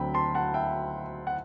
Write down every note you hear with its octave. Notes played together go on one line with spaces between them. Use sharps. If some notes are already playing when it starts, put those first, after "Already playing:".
Already playing: D2 D3 F#3 C4 G5 B5
A5 C6
F#5 A5
E5 G5
F#5